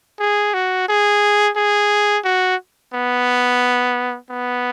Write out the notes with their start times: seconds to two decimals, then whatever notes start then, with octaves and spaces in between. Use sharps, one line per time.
0.20 G#4
0.54 F#4
0.88 G#4
1.56 G#4
2.25 F#4
2.94 B3
4.31 B3